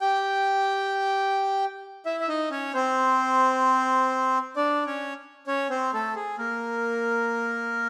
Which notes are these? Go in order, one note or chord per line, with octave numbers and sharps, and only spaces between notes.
G4 G5
E4 E5
E5
D#4 D#5
C#4 C#5
C4 C5
D4 D5
C#4 C#5
C#4 C#5
C4 C5
A3 A4
G#4
A#3 A#4